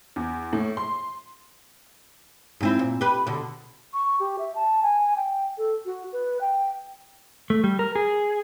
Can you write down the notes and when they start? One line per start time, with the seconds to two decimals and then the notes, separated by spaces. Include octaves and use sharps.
0.16 E2
0.53 A2
0.77 C6
2.61 G#2 C4 E4
2.79 A#2
3.01 G4 B4
3.27 B2 D3
3.94 C#6
4.20 G4
4.39 E5
4.55 A5
4.83 G#5
5.17 G5
5.58 A4
5.85 F#4
6.12 B4
6.41 G5
7.50 A3
7.64 G3
7.79 A#4
7.95 G#4